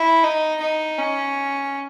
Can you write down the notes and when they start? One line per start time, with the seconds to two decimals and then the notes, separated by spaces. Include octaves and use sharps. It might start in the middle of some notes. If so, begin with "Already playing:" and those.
Already playing: E4
0.24 D#4
0.61 D#4
0.99 C#4